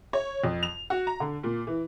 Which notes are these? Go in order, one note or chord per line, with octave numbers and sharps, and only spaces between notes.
C#5
F2
F7
F#4
A#5
D3
A#2
E3